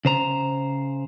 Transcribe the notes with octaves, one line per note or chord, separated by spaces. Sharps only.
C#3 C5 A#5